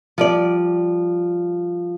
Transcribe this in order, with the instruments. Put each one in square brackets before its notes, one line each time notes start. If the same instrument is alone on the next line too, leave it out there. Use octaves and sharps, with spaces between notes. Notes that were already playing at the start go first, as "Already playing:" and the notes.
[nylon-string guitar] F3 G3 D5